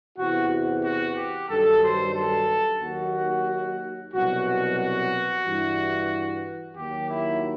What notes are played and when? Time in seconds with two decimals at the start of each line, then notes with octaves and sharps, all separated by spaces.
0.17 E2 C3 E3 F#4
0.84 F#4
1.17 G4
1.49 G2 D#3 F#3 A4
1.82 C5
2.15 A4
2.81 D#2 D#3 F#3 F#4
4.13 C2 B2 F#3 F#4
4.46 F#4
4.79 F#4
5.45 G2 E3
6.77 D#2 D#3 F#3 G4
7.10 E4